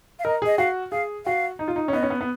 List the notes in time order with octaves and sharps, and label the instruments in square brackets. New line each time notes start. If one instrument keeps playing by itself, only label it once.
[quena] F5
[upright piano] A#4 [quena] D#5
[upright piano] G#4 [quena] D#5
[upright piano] F#4 [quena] F5
[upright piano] G#4 [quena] F5
[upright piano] F#4 [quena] F5
[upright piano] D#4
F4
D#4
C#4
[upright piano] B3 [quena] D#5
[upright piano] C#4
B3
B3